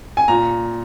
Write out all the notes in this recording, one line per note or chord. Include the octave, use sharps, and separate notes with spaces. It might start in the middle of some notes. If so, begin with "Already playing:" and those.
G#5
A#2 A#5